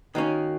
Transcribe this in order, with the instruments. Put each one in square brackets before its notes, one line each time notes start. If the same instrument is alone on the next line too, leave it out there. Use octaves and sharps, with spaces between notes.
[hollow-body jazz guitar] D#3 A#3 C#4 [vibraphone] D#4 F#4